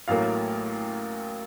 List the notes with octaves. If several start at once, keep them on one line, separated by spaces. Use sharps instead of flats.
A1 A2 F#3 A#3 F5